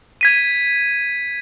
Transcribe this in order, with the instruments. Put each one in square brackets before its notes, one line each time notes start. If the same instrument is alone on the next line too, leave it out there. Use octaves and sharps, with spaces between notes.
[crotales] G#6 B6 D#7